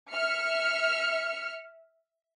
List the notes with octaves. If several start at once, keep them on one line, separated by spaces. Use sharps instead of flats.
E5 F6 C#7